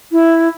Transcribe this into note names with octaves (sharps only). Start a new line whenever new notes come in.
E4